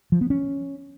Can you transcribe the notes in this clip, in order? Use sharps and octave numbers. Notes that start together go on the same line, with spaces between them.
F3
B3
C#4